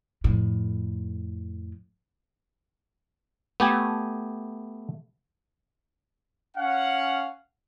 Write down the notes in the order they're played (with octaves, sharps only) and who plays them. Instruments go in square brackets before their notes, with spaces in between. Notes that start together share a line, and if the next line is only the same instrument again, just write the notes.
[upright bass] F2 A2
[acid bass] A3 [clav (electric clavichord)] B3 G4 G#5
[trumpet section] C#4 F5 F#5